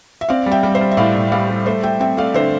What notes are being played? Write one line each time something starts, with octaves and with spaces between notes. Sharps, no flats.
E5
C4 D5 F5
G3
E5 G5
G3
C5 E5
G3
E5
A2 D5 F5
A2
E5
G3 D5 F5
G3
A3 C5 E5
A3 E5 G5
C4 E5 G5
A3 D5 F5
D3 C5 E5